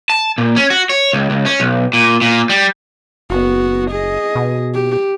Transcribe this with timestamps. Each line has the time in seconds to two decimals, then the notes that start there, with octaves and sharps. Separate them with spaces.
0.10 A5
0.38 A#2
0.56 C#4
0.70 F#4
0.90 C#5
1.13 C#2
1.30 C#2
1.46 C#4
1.60 B1
1.93 A#2
2.21 A#2
2.50 G3
3.30 F#1 B3 F#4
3.91 G#4 D#5
4.35 B2
4.74 G4